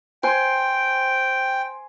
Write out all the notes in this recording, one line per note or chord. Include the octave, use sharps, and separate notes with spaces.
C5 G5 G#5 C6